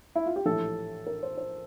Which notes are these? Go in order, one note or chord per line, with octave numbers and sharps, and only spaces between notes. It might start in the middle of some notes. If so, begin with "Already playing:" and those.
E4
F4
G4
A#1 A2 E3 A4
A#4
C5
C5